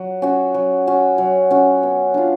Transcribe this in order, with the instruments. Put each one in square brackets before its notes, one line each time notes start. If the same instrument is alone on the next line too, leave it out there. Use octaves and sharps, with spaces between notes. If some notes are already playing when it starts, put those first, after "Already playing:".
Already playing: [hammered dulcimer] F#3
C#4 F#4
F#3
C#4 F#4
F#3
C#4 F#4
B3
D4 F4